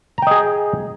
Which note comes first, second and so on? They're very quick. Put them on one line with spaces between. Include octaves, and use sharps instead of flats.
A#5 G5 D#5 G#4